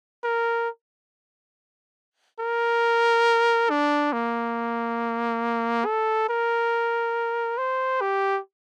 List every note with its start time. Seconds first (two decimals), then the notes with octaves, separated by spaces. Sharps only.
0.23 A#4
2.39 A#4
3.70 D4
4.13 A#3
5.85 A4
6.29 A#4
7.58 C5
8.01 G4